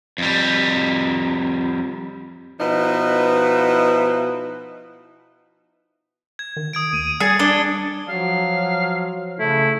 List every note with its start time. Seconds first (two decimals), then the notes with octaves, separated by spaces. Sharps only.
0.18 F2 G3
2.59 B2 F3 D#4 E4 B4
6.39 G#6
6.56 D#3
6.73 D#6 G#6 D7
6.93 D#2 D#7
7.20 G3 G#4 A6 C#7
7.39 D4 G7
8.09 F3 F#3 F5
9.39 C#3 A3 E4